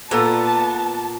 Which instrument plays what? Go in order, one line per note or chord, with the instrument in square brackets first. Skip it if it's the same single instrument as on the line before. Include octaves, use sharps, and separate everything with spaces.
[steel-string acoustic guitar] A#2 [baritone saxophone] B3 [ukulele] F4 A4 A#5 [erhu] A5